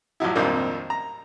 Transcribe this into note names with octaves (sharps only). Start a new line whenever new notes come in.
A1 F3 F#3 E4
G#1 F2 A#2 G3 A#3 D4
A#5